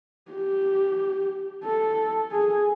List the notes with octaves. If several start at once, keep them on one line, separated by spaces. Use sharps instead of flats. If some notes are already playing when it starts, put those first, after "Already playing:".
G4
A4
G#4